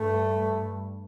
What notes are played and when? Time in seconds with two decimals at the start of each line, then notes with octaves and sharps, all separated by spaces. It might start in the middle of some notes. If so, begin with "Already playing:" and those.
Already playing: G2 A3